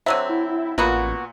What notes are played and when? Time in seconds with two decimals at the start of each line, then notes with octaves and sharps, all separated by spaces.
0.06 D3 F#3 C4 E5
0.29 E4
0.78 A1 A#2 A#3 B3 F#4